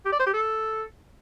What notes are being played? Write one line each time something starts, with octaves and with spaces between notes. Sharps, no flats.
G4
D5
C5
G4
A4